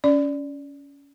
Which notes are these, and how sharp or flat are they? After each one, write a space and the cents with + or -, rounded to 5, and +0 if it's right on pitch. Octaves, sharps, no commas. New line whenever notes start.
C#4 +25 D5 +0